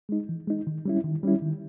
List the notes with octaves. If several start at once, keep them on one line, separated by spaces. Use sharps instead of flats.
G#3 D#4
E3
G#3 D#4
D#3
G3 C#4 E4
D#3
G3 C#4 E4
D#3